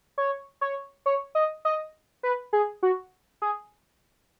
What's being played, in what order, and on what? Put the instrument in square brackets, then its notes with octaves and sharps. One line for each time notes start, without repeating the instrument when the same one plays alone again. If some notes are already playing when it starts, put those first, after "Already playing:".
[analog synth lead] C#5
C#5
C#5
D#5
D#5
B4
G#4
F#4
G#4